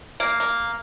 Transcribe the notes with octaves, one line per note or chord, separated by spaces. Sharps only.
A#3
A#3